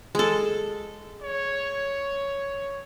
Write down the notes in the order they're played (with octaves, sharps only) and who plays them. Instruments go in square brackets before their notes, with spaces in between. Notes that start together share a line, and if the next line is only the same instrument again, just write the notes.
[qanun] G#3 A4
[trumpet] C#5